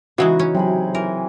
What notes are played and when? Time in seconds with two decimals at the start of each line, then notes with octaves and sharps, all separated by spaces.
0.18 C#3 E3 G#3 D#4 E4 F#4
0.39 C#4
0.55 C3 F#3 G#4 B5
0.95 E3 A#4